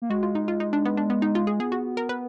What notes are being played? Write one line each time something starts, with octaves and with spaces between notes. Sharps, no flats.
A#3
G#3 F#4
F4
D#4
F4
D#4
D4
B3
D4
B3
D#4
F4
G#4
B3 G#4
F#4
A#4
B4